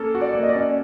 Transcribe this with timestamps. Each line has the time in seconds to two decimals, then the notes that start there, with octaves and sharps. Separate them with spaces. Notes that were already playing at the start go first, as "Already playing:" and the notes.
Already playing: A#3 C#4 A4
0.15 F#4
0.21 D5
0.35 A#3
0.43 D#5
0.49 D5
0.55 C#4